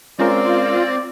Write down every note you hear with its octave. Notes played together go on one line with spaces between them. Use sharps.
G#3 C4 C#4 F4 A#4 D5